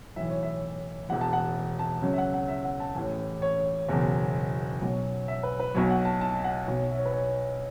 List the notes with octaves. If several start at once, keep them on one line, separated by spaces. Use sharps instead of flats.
B1 A2 E3 E5
C#5
E5
E1 E2 E3 F#5
A5
F#5
A5
C#2 C#3 F#3
E5
F#5
F#5
E5
F#5
A5
A1 A2 E3
C#5
F#1 E2 B2
B1 B2 F#3
E5
B4
B4
B1 B2 F#3 C#5
F#5
A5
A5
F#5
B1 B2 F#3
E5
C#5
B4
C#5